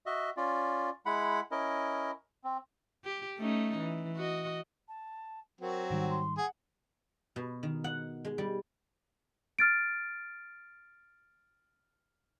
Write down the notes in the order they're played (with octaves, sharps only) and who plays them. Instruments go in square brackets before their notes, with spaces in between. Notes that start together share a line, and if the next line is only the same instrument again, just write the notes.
[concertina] F#4 D#5 E5
C#4 F4 D5
G#3 E4 F#5 B5
C#4 E4 A#4 D#5
C4
[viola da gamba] G4
A3 C#4 D#4
E3
F#4 D#5
[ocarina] A5
[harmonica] F#3 C4 F#4 [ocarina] A#4
[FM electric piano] G#2 D#3 G3 [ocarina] F#5
[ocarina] C6
[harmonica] G#4 [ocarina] F#5
[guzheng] B2
D#3
F#5
G#3
G3
[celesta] F6 A6 D7